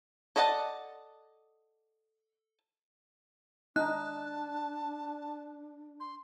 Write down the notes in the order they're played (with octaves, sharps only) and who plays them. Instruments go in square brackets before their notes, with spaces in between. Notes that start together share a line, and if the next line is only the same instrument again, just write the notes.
[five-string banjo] A4 D5 D#5 F#5 A5
[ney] D4 [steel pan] D#4 [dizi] A5 [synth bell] F#6
[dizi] C6